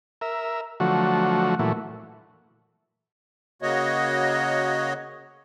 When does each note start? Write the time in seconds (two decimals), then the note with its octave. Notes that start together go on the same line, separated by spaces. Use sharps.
0.21 A#4 E5
0.80 D3 F3 F#3 A3 F#4
1.59 A#2 E3 F#3 A3
3.62 C#3 A#3 F#4 C#5 D#5